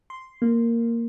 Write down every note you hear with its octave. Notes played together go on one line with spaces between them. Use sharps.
C6
A#3